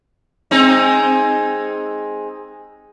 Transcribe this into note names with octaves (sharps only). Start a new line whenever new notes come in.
G#3 C4 D#4